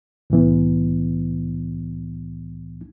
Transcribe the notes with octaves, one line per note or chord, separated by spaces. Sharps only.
C2 A2 E3 B3